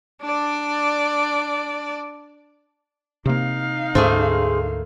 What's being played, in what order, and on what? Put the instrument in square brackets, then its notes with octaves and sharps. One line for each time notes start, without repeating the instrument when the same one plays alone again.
[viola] D4 D5
[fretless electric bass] C3 A#3 [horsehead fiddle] D#4 F5
[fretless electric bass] D2 G#2 C#4 [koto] A3 A#3 [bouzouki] G#4 C5